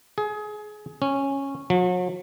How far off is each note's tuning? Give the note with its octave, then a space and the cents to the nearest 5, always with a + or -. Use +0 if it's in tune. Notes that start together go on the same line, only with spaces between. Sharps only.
G#4 +25
C#4 -10
F#3 -40